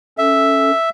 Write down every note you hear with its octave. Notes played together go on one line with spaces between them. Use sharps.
C#4 A4 E5